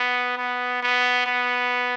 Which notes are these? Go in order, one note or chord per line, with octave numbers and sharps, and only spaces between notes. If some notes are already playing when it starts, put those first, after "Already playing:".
Already playing: B3
B3
B3
B3